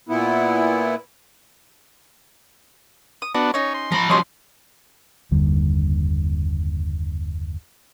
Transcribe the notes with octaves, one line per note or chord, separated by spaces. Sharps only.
A#2 B3 E4
D#6
B3 D4 F#4
C#4 D#4 C#5
C6
F3 A#5 B5
F3 G3 C#4 C#5 D#5 C6
F#1 D#2 D3 G3